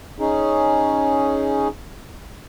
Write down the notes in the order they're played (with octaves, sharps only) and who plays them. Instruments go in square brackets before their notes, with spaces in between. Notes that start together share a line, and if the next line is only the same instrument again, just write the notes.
[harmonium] C#4 D#4 G#4